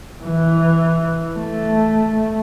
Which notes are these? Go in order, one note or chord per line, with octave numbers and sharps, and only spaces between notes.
E3
A3